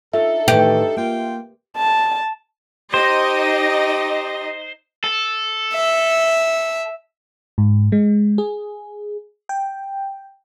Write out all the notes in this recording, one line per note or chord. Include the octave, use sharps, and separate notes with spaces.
D4 D#4 F4 A4 E5
A2 D#3 E3 G4
A#3 F4 G5
A5
D#4 G4 C5 D#5
A4
E5
G#2
G#3
G#4
G5